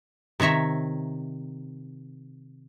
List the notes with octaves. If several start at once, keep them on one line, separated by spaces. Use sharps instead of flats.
C3 D#3 C#5 E5 A#5